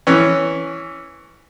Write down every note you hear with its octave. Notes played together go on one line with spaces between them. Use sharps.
E3 C#4